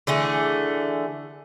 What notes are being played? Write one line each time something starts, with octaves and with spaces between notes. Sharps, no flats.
D3 E3 A3 G#4